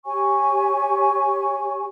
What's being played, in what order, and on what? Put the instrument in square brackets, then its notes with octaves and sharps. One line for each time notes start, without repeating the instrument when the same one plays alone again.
[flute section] G4 C#5 G#5 C#6